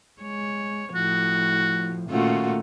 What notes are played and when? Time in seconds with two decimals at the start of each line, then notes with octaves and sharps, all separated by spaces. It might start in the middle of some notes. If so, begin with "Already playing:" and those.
0.22 G#3 C#5
0.95 A2 F3 F#4
2.10 A#2 D#3 A3 C#4 F4 F#4